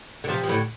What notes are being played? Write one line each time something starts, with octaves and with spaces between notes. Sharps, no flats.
D3
C3 F3
F3
A2 D3